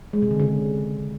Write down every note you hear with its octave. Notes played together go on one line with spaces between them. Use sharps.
G#3
C3
D3
C#3